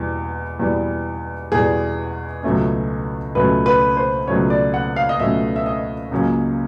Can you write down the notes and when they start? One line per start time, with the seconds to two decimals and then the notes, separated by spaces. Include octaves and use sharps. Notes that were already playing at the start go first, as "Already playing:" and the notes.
Already playing: E2 B2 G3
0.60 E2 B2 G3
1.52 E2 B2 G3 G#4
2.43 C#2 B2 F#3 A3 C#4
3.35 C#2 B2 F#3 A3 C#4 B4
3.66 B4
3.97 C5
4.27 C#2 B2 F#3 A3 C#4 C#5
4.50 D5
4.74 F#5
4.96 F5
5.09 D#5
5.19 C#2 B2 F#3 A3 C#4 E5
5.56 E5
5.66 D#5
6.11 C#2 C#3 F#3 A#3 C#4